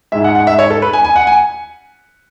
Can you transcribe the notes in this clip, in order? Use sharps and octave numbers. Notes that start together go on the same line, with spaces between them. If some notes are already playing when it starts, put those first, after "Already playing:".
G#2 G#3 E5
F#5
F#5
E5
C#5
A4
B4
G#5
G#5
F#5
G#5